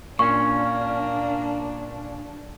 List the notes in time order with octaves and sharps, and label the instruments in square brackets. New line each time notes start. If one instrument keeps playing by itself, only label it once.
[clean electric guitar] A#2 C#4 [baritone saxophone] A#3 [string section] D4 [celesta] C#6